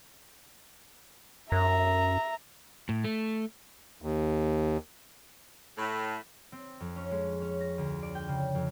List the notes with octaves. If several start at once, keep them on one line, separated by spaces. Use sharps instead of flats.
F#2 E5 A#5
A2
A3
D#2
A2
C4
F2
C#4
G#3
C#4
A#6
D2
D5
G5
C#3
F2